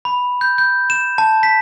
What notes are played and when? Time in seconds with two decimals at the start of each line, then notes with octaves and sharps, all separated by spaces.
0.05 B5
0.41 G6
0.58 G6
0.90 E7
1.18 A5
1.43 B6